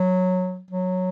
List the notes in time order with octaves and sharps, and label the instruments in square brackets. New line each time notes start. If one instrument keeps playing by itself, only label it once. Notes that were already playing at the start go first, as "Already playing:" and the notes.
Already playing: [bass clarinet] F#3
F#3